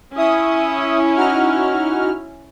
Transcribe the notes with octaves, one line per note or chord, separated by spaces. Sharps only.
C#4 E4 E5 D#6
D#4 F#4 F6